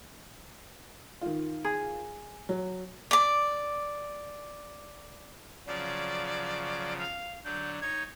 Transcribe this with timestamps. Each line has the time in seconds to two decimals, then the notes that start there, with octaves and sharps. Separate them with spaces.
1.21 D#3 F4
1.64 G#4
2.49 F#3
3.11 D5 D6
5.67 C#3 F3 F#3 D5
6.99 F5
7.44 D3 F#3 D4 G6
7.82 D#4 C#5 G#6